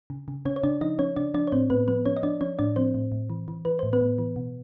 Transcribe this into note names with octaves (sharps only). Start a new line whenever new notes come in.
C#3
C#3
C#3 C#4 C#5
C#5
C#3 D4 D5
F3 D#4 D#5
F3 C#4 C#5
C#3 D4 D5
F3 D4 D5
C#5
A2 C4 C5
A2 B3 B4
F3 B3 B4
F3 C#4 C#5
D#5
F3 D4 D5
F3 C#4 C#5
A2 D4 D5
F3 C4 C5
A2
A2
E3
E3
E3 B4
A2 C5
B3 B4
A2
E3
B2